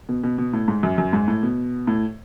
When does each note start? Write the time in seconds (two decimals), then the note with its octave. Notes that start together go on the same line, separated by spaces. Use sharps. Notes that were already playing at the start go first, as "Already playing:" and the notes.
0.09 B2
0.24 B2
0.38 B2
0.53 A2
0.68 G#2
0.83 F#2
0.98 F#2
1.13 G#2
1.28 A2
1.43 B2
1.87 A2